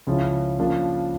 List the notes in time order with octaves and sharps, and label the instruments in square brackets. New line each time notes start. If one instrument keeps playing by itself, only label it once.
[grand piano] C#2 C#3 F3 C#4 E4
C#3 F3 A#3 D4 F4